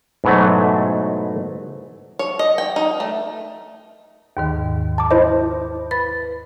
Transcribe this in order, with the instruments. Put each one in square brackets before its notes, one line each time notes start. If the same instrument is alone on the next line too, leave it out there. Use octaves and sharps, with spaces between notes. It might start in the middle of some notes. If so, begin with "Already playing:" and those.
[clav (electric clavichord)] G#2 B2 E3 F#3 A3
[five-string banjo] C#5
D#5
G5
D#4
A3
[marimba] D#2 G#2 D#3
[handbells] A5 D6
E4 C5 D#5
[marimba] B4 B5 A6